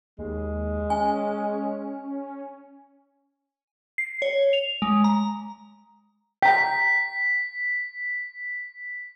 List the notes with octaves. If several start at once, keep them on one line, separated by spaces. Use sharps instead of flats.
D#2 G#3
C#4 G#5
C7
C#5
F7
G#3
A#5
G5 A#5 B6